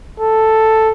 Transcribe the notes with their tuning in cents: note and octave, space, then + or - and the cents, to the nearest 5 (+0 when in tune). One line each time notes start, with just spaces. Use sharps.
A4 +0